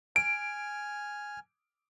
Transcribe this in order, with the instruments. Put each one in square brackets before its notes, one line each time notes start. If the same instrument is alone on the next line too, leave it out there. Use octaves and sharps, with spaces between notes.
[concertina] G#5 F6 [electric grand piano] D7